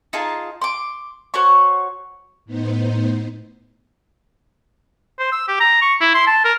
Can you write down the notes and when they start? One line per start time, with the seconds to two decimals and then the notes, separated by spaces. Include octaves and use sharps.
0.13 D#4 F4 G#4 A5
0.62 C6 D6
1.34 F#4 C5 C#5 C#6
2.45 A2 B3 D#4 C5
5.19 C5
5.32 E6
5.48 G4
5.60 A#5
5.82 C#6
6.01 E4
6.14 C6
6.27 A5
6.44 A#4